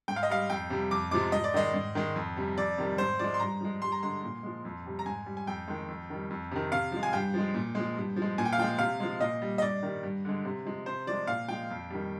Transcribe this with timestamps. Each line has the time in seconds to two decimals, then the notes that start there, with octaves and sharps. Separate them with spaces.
0.08 G#2 G5
0.16 F5
0.23 D#5
0.30 G3 F5
0.50 F2 G5
0.70 C3 G3
0.91 F2 D6
1.11 C3 F3 G#3 D6
1.32 G#2 D#5
1.44 D5
1.54 D#3 G#3 D#5
1.74 G#2
1.95 D#3 G#3
2.16 F2
2.37 C3 G3
2.57 F2 D5
2.78 C3 D#3 G3
2.98 G#2 C5
3.19 F3 G#3 D5
3.34 C6
3.40 G2 A#5
3.61 F3 G#3
3.82 G2 C6
3.92 A#5
4.03 D3 G#3 C6
4.24 A#2
4.43 F3 G#3
4.65 F2
4.86 C3 G3
4.99 A#5
5.06 G#2 G#5
5.26 G3
5.37 G#5
5.47 F2 G5
5.68 D#3 G#3
5.88 F2
6.10 D#3 G3
6.30 F2
6.51 C3 D#3
6.72 C3 F5
6.92 F3 G#3
7.03 G#5
7.13 G2 G5
7.34 F3 G#3
7.54 A#2
7.75 F3 G#3
7.97 G2
8.16 F3
8.22 G#3
8.38 A#2 G#5
8.45 G5
8.53 F5
8.58 F3 G#3 G5
8.78 C3 F5
9.00 F3 G#3
9.21 A#2 D#5
9.42 G3
9.58 D#5
9.62 G2 D5
9.83 D#3 G3
10.03 G2
10.25 D3 G#3
10.45 C3
10.65 F3 G#3
10.86 C3 C5
11.07 F3 G#3 D5
11.27 A#2 F5
11.48 F3 G#3 G5
11.70 F2
11.90 D#3 G3